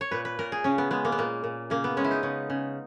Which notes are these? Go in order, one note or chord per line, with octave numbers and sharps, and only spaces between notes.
C#5
A#2 B4
B4
A#2 A#4
G#4
C#3 C#4
B3
G#3 B3
A#3
B3
A#2 A#3
A#2
C#3 A#3
B3
G#3 C#4
E4
D#4
C#3
C#3